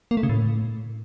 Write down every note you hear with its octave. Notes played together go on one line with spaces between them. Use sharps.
A#3
A3
C#3
A2